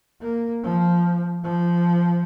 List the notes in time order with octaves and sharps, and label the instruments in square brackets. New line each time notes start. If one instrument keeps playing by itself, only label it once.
[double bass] A#3
F3
F3